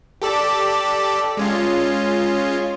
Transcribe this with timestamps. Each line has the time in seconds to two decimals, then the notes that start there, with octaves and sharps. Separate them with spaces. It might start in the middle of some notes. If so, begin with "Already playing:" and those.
0.22 G4 A4 D5
1.37 G#3 C#4 F4